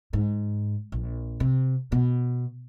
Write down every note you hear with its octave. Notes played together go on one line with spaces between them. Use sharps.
G#2
A#1
C3
B2